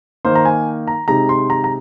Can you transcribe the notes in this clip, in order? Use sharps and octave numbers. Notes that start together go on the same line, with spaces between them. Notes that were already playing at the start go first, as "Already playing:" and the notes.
D#3 A#3 D#4 C5
A#5
G#5
A#5
C3 G#3 D#4 A#5
C6
A#5
A#5